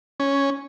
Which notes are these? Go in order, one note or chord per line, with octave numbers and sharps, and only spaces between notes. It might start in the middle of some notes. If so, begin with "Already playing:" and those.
C#4